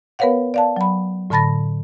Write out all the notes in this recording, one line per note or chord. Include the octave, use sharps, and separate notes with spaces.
B3 A#4 B4 C#5 F5 F#5
D5 F5 A5
F#3 B5
A2 D3 A5 B5 A6 A#6